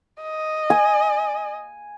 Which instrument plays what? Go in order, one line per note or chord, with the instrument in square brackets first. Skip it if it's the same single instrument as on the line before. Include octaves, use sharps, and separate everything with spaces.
[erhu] D#5
[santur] G#5